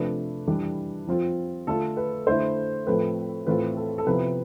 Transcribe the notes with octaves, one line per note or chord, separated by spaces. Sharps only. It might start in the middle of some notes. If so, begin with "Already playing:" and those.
Already playing: C3 F3 A3 D4 B4
E3 G3 D4
F3 C4 F4
D3 A3 D4 F4 A4
B4
D3 A3 E4 C5
A2 F3 A3 C4 B4
A2 E3 A3 C4 F4 B4
A4
A4
C3 F3 B3 E4 B4